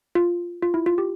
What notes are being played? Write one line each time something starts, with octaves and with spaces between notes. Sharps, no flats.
F4
F4
E4
F4
G4